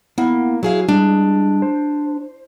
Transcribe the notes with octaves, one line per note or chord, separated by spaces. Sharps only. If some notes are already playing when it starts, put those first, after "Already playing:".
A#3 B3 E4 F#5
F#3 E4 G#4 F5
G3 G#3 D4
C5